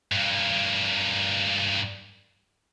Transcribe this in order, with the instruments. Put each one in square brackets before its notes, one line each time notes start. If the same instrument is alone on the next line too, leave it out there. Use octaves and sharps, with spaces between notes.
[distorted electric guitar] G2 A#3